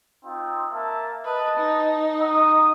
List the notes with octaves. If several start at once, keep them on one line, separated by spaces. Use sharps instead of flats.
C4 D#4 F4
A#3 E5 A5
B4 D#5 A5
D#4
F#5 A#5 D#6